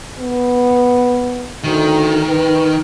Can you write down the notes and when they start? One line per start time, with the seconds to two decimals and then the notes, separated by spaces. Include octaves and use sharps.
0.18 B3
1.64 D2 D#3
2.29 B4